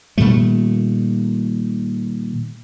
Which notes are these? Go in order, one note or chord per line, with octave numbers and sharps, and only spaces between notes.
A#2 D#3 G3 A3